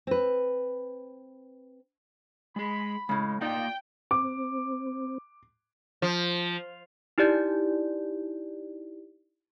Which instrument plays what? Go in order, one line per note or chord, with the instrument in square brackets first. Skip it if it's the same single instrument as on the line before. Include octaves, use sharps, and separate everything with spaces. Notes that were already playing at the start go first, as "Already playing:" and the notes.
[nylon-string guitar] C4 B4
[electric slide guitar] G#3 G#4 [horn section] B5
[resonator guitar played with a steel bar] A2 C#3 [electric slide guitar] G#3
[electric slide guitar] A#3 F4 D5 [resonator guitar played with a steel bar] D#4 [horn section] G5
[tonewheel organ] C4 [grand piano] D6
[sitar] F3
[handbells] D#4 E4 G4 D5 G6